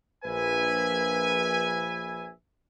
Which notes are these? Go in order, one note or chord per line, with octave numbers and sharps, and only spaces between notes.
A#1 B4 E5 G#5